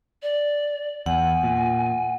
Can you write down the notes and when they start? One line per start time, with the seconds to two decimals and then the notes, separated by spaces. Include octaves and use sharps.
0.22 D5
1.06 E2 F#5 G#5
1.44 A#2